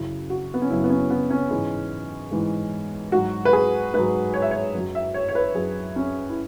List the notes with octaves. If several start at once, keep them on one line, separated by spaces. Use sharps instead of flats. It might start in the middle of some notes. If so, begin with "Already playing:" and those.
Already playing: F#2 C#3 F#3 E4
F#4
B3
C#4
F#2 C#3 F#3 E4
B3
C#4
B3
C#4
G#2 E3 G#3
G#2 E3 G#3
G#2 F#3 F#4
B4
G#4
G#2 F#3 B4
C#5
E5
C#5
F#2 F#3
E5
C#5
C#5
B4
F#2 F#3 G#4
C#4
E4